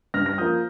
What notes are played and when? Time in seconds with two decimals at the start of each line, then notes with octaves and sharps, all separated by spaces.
0.14 G2 F6 A#6
0.26 F6 A#6
0.38 F3 D#6 G6
0.41 A#3